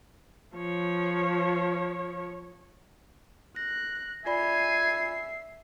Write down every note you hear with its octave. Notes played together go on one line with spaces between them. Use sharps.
F3 C#5
F#6 A#6
F4 D5 E5 G#5 B5 C7